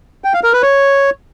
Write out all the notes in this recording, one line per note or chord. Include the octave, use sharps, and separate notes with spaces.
G5
F5
A#4
B4
C#5